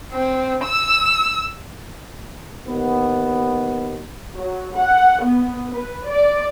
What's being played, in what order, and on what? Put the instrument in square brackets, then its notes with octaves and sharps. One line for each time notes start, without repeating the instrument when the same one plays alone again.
[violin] C4
E6
[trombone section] D#2 B3
[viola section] F#3
F#5
B3
B4
D5